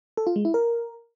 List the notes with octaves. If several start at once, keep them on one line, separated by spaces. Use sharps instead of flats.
A4
F4
G#3
E4
A#4